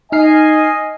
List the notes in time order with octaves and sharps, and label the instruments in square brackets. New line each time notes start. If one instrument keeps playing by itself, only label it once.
[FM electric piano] D#4 F6 C7 [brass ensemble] D#5 G#5